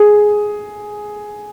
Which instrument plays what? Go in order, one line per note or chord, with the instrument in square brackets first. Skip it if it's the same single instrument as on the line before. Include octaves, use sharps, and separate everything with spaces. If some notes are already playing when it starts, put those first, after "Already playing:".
Already playing: [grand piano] G#4